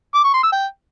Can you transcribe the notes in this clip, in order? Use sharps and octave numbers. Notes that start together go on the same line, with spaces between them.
D6
C#6
C6
E6
G5